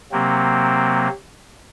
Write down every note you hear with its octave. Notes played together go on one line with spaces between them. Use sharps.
C3 F#3 A#3 C4